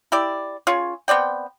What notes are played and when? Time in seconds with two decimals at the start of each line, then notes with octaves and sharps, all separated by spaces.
0.12 E4 G4 D5
0.67 C#4 F4 G#4
1.08 B3 C4 D5 G5